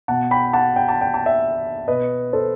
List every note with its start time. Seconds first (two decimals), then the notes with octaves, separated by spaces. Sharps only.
0.08 B2 F#5 A5
0.31 G5 B5
0.53 F#5 A5
0.76 G5
0.89 A5
1.01 G5
1.14 A5
1.26 E5 G5
1.88 B2 B4 D#5
2.33 A4 C5